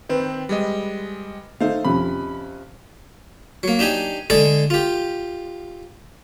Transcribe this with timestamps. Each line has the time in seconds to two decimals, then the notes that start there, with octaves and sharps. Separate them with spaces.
0.09 D#3 C4 B4
0.49 G3 G#3 D#5
1.61 A3 D#4 C5 F5
1.85 F2 C3 C#4 B5
3.63 F#3 A#3
3.79 D4 D#4 G4 G#5
4.30 D3 G#3 G#4 A4 D5
4.70 F4 G4